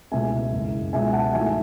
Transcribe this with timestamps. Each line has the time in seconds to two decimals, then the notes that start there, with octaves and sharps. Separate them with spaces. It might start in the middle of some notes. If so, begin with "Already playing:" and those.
0.12 C#2 B2 A3 E5 G#5
0.52 F#1 F#2 C#3 G#3
0.93 C#2 B2 G#3 E5 G#5
1.13 F#5 A5
1.33 A1 G#2 F#3 A3 E5 G#5